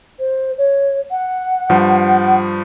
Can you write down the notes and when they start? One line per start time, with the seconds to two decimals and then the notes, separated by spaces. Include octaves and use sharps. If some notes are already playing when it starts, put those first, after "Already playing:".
0.19 C5
0.58 C#5
1.11 F#5
1.70 G2 F3